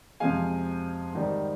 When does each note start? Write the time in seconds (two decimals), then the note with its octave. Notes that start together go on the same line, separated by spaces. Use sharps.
0.20 F2 C3 F3 G#3 F5 G#5
1.13 G#2 D#3 G3